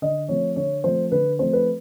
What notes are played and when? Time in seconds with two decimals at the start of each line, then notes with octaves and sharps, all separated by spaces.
0.02 D3 D#5
0.29 F3 A3 C4 C#5
0.56 D3 C#5
0.84 F3 A3 C4 C5
1.12 D3 B4
1.39 F3 A3 C4 C5
1.53 B4